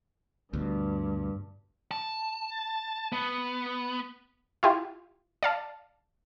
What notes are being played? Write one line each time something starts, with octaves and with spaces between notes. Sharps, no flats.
D2 G2 B2
A5
B3
E4 F4 G4
D5 F5 A5